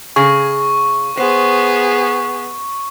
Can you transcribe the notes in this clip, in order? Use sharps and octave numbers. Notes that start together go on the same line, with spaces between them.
C#3 G#4 C#6
B3 G#4 C5